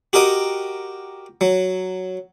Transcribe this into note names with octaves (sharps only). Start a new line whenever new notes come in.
F#4 G4 A#4 D#5 G5
F#3